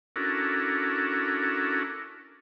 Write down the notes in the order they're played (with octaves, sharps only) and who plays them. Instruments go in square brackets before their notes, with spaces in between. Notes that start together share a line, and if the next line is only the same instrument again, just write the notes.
[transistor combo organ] C#4 D4 E4 F#4 A4 A#4